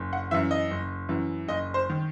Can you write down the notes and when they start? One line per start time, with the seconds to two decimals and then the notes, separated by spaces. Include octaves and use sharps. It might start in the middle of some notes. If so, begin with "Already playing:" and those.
Already playing: F#1
0.13 F#5
0.31 F#2 E3 E5
0.51 D#5
0.71 F#1
1.09 F#2 E3
1.48 F#1 D#5
1.74 C5
1.90 D#3